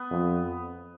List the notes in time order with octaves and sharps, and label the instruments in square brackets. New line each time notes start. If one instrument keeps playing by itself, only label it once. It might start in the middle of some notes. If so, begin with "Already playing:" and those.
Already playing: [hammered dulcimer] B3
[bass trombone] F2